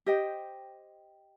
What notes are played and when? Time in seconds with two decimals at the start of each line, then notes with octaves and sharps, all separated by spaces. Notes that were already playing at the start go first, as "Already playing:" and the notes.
0.06 G4 C5 D#5 G5